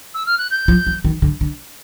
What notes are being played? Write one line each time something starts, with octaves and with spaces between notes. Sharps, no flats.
E6
F6
F#6
G6
F3
E3
D#3
D3
D3